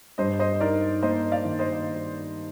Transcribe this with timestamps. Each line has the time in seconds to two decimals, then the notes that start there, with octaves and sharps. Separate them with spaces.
0.18 G2 C5 D#5
0.39 C5 D#5
0.60 D#4 A#4 D5
1.03 A#3 C5 D#5
1.32 D5 F5
1.45 D#3
1.59 C5 D#5